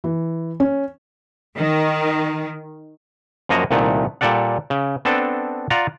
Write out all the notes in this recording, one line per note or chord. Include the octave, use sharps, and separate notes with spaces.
E3
C#4
D#3
F#2 F3 A#3 F#4 D#5 A#5
C2 A#2 D#3 A3 F#5
A#2 G3 A4 D5 F#5
C#3
B3 C4 D4 A4
F4 D5 F#5 A#5